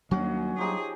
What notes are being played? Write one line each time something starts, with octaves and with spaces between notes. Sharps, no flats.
D#2 F#3 G3 C#4 D4 F#4
F3 D#4 G4 G#4